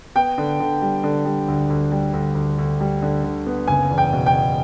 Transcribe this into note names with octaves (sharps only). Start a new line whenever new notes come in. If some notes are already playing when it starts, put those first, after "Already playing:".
B3 G5
D3
D3
G3
D3
G3
D2
D2
G3
D2
D2
D2
G3
D3
D3
B3
F#1 G#5
E2
G5
B2
G5
B2